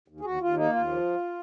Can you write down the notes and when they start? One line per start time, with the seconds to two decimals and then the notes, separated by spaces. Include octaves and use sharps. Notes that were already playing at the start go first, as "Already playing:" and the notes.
0.08 D#2
0.20 G#4
0.25 D#2 F#4
0.41 D#2 F4
0.56 A#3 D#4
0.72 D#2 F4
0.89 F3